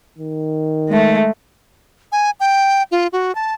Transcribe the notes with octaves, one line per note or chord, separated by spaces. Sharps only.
D#3
G#3 A3
G#5
G5
F4
F#4
A5